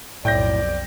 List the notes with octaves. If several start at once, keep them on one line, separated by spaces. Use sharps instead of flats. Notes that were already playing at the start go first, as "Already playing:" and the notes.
B1 F2 A2 D5 G5 G6 A#6